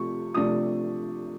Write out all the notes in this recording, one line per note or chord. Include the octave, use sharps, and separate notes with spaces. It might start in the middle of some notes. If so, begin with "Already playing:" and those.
Already playing: C3 F3 A3 C#6
C3 F3 A3 D4 D#6